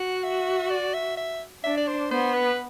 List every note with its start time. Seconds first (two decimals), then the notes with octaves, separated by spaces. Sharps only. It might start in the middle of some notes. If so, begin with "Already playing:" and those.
Already playing: F#4 F#5
0.24 E5
0.70 D5
0.94 E5
1.17 E5
1.64 D4 E5
1.77 D5
1.87 C5
2.10 B3 C5
2.34 B4